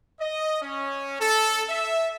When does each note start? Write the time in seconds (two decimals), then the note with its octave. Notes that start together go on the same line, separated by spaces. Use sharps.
0.21 D#5
0.62 C#4
1.20 A4
1.69 E5